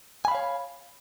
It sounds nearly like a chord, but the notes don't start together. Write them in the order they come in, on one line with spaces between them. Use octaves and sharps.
G#5 B5 F5 C#5